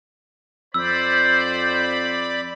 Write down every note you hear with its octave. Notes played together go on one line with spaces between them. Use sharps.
F2 C5 D5 B5 E6